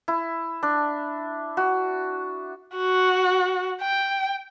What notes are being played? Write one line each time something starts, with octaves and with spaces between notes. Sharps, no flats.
E4
D4
F#4
F#4
G5